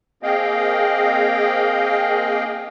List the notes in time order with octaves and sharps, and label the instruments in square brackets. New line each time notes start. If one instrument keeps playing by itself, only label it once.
[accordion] A#3 C4 G#4 D#5 F5 G5